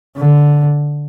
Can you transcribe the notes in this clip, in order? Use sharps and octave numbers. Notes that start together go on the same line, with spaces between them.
D3